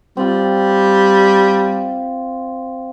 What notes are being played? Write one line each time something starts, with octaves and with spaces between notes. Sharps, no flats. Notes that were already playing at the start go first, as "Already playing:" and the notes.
G3 C4 F4